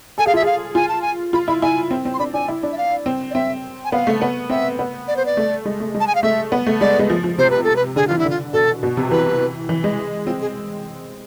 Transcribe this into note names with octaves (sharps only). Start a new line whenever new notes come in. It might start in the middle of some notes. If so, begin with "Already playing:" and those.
A4 G#5
G#4 F5
F4 E5
G#4 F5
F4 G#5
A5
G#5
F4 B5
E4 B5
E4 G#5
C4
C4
C6
D4 B5
D4 G#5
E4
D4
E5
F5
C4
D5
C4 E5
G#5
B3 F5
A3
B3
C4 E5
B3
D5
C5
D5
A3
G#3
A3
G#3
A5
G#5
F5
A3 E5
B3
A3
G#3 D5
G#3
F3
F3
C3 C5
B4
A4
B4
D3 G#4
E3 F4
E4
D3
F4
B2 A4
B2
C3
E3 B4
E3
G#3
C4 F4
G#4